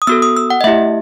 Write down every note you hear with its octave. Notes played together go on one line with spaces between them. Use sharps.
D#6
B3 F#4 A4 E6
D#6
E6
F#5
D#5
A3 E4 G4 E5